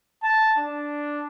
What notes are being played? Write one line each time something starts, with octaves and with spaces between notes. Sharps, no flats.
A5
D4